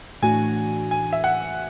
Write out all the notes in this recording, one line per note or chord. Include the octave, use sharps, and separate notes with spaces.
A2 E3 A3 D4 F#4 G#5
G#5
E5
F#5